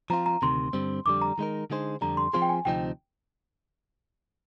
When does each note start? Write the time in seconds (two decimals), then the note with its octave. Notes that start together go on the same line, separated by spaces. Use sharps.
0.10 F3 C4 F4 A#5
0.26 A#5
0.42 D2 C3 D#3 C6
0.73 G2 D3 G3 C4
1.05 F2 D3 G3 D6
1.22 A#5
1.38 D#3 G#3 D#4 A#4
1.70 D3 G#3 D#4 G#4 C5
2.01 F2 D3 G3 A#5
2.17 C6
2.33 F3 C4 F4 G#4 C5 C6
2.42 G5
2.49 G#5
2.65 D2 C3 F3 C4 D#4 G5